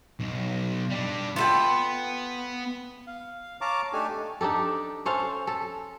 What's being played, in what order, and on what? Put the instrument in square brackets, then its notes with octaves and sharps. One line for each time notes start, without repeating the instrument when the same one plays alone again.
[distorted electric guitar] B1
G3 D4
[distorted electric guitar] B3 B5 [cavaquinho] F4 A4 G5
[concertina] F5
C#5 F5 A5 A#5 D6
A3 D4 D#4 G4 A4 G#5
[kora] D4 D#4 G4 A4
C#4 A4 C5 F5
A4